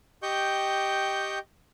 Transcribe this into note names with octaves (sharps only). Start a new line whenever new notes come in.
G4 D#5 G5 C#6 G6